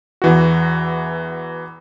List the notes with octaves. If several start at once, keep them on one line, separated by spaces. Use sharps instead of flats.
E2 E3 F#4